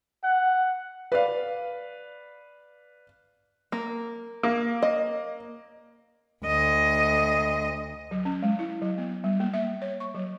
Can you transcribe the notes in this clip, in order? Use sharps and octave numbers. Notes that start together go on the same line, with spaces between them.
F#5
B4 D5 F5
A#3
A#3
D#5
D2 D#5
F#3
C#4
G#3
E4
F#3
B3
G3
A#3
E5
C#5
C#6
F#3